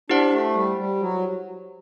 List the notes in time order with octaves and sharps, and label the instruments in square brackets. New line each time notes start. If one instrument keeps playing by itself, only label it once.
[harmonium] D4 [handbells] E4 G4 C5 F#5
[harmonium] A3
G3
G3
F#3